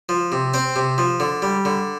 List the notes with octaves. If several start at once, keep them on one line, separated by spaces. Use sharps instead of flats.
F3
C3
C4 C5
C3
F3
D3
G3
D3